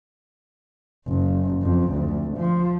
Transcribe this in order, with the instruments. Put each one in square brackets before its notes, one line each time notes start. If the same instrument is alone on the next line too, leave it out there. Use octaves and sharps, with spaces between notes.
[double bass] F#1
F2
D2
F3